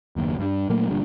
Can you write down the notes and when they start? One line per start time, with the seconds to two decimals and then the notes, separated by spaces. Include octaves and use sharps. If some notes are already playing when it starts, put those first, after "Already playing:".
0.16 F#1 D#2
0.39 G2 G3
0.69 A#2 F#3 A3 A#3
0.90 G1 G2 A#2